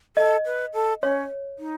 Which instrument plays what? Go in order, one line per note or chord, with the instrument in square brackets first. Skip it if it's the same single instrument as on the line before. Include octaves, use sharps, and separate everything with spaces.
[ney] A4 [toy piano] D#5
[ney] B4
A4
[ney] C#4 [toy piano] C#5
[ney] D#4